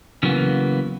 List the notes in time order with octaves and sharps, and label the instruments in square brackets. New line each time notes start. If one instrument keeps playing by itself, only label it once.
[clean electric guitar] C#3 E3 F#3 A#3 B3